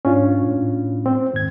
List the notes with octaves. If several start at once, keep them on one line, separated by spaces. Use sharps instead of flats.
G#2 C#4 D4 F4
A2
C4
D#2 G#2 G#6